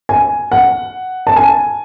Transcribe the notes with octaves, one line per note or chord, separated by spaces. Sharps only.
G#5
F#5
A5
G#5